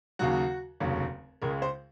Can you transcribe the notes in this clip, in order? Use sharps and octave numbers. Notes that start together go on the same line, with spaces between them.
D#2 C#3 F#3 F#4
F1 D#2 C#3 F#3
C#2 C#3 G#3 A#4
C5